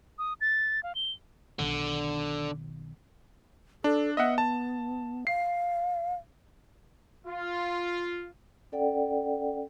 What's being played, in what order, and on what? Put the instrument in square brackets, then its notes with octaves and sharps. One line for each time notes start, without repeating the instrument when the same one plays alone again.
[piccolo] D#6
A6
F5
G7
[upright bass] B1 D#3 [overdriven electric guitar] D3
[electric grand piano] D4 [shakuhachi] A4
[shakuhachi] B3 [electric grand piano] D#5 E5 F#5
[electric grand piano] A5
[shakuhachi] F5 [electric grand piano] C7
[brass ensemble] F4
[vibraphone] C#4 A4 D5 F#5 G5